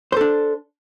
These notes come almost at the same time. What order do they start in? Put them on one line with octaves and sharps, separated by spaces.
C5 A4 D4